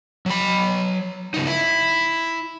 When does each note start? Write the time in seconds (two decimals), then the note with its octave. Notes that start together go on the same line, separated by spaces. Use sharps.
0.26 F#3 B5
1.34 C#2 D#4
1.47 E4